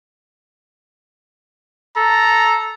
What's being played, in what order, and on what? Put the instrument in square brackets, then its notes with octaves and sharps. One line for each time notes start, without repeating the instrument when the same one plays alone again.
[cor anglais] A4 [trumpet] A#5